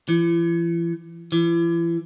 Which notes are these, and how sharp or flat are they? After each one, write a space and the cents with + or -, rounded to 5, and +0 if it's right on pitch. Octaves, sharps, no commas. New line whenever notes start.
E3 +40
E3 +35